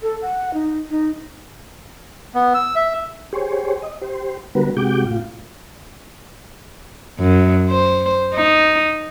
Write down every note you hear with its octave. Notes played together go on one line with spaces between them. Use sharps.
A4
F#5
D#4
D#4
B3
E6
E5
G4 G#4 C5 C#5
D#5
G4 C5
D3 G3 B3 F#4 A#4 B4
C3 G#3 F#4 G4 D6 G6
A2 F4
F#2
C5
D#4